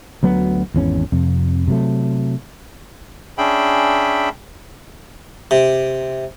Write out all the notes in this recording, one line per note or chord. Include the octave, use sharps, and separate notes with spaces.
D2 F#3 B3
G#1 E2 C#4
F2 C3
C3 F#3 A3
C#4 D4 G#4 E5 G5 B5
C3